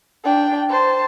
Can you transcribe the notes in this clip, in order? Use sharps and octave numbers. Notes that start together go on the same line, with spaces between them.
D4 G5
C5 A5